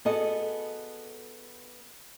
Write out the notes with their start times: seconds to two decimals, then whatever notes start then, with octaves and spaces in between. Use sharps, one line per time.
0.05 B3 F#4 G#4 A4 D#5